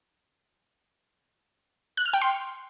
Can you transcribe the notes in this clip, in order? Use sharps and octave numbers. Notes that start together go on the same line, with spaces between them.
F#6
F6
G5
C6